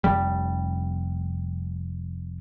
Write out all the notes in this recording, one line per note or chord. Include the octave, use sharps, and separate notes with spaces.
F1 G3